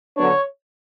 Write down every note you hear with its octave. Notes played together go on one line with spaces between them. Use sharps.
D3 F#3 B3 D4 C#5